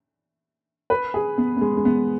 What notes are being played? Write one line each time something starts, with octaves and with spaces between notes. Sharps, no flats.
B4
G#4
B3
B3
G#3
G#3
B3